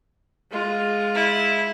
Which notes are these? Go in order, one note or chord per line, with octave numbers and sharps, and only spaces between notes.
G#3 F4
E4